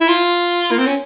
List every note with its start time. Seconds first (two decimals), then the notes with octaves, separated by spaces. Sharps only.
0.01 E4
0.08 F4
0.71 A#3
0.79 C4
0.86 C#4